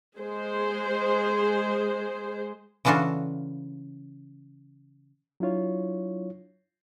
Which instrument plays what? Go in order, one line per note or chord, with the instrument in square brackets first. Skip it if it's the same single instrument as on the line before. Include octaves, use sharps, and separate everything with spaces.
[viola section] G#3 G#4 C5
[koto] C#3 E3 D4 F4 F#4 A4
[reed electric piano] F#3 D4 E4 F4 C#5